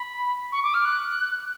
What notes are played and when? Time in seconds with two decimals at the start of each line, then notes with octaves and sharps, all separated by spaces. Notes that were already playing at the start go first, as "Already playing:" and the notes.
Already playing: B5
0.52 C#6
0.63 D6
0.74 F6
0.85 F#6